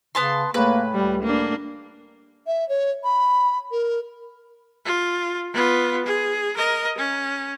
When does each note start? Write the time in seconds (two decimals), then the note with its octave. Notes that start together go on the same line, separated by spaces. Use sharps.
0.15 C#3 B3 A5 C6
0.54 A2 A#3 G#4 B4
0.94 C#2 G3
1.24 A#3 D4
2.47 E5
2.69 C#5
3.04 B5
3.71 A#4
4.86 F4
5.54 B3 F4
6.06 G#4
6.56 A#4 D#5
6.98 C#4